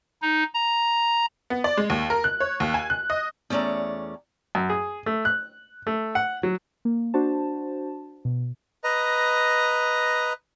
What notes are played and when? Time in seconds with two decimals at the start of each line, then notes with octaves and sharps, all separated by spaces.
0.22 D#4
0.54 A#5
1.50 B3
1.64 D5
1.77 G#3
1.90 D#2
2.10 A#4
2.24 F#6
2.40 C#5
2.60 D#2
2.74 G#5
2.90 F#6
3.10 D#5
3.50 E2 A3 C#4 D5 A#5
4.55 F#2
4.70 G#4
5.06 A3
5.25 F#6
5.87 A3
6.15 F#5
6.43 F#3
6.85 A#3
7.14 D4 F#4 C5 A5
8.25 B2
8.84 B4 D#5 A#5